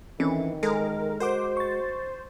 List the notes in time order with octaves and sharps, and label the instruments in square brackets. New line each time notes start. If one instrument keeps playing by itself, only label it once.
[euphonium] D#3 [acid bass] E3 [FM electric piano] C4 C#4 A4
[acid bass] G#3 [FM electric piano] A4 [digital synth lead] A#4
[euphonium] F#4 [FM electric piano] A#4 F#5 D6 [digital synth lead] C5
[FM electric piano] C#6 A6